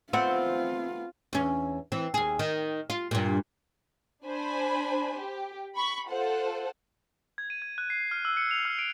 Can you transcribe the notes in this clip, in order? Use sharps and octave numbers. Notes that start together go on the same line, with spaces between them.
A3 B3 C4 F4 F#5
E2 C#4
E3 C4
D#2 G#4
D#3
F4
G2 A#2
D4 C5 G#5 B5
G4
B5 C#6
F4 A4 C5 F#5
G#6
D#7
G#6
F#6
C7
F6
E6
C#7
F7
F6
D7